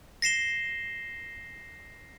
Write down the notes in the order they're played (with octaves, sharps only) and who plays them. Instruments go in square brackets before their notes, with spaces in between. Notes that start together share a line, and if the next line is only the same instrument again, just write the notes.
[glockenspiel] A#6 C7 E7 G7